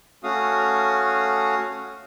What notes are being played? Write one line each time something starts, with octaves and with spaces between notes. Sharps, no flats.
A3 C#4 F#4 F5 D#6